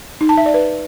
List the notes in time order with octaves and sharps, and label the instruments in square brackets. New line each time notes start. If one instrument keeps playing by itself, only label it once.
[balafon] D#4
A5
E5
D5
B4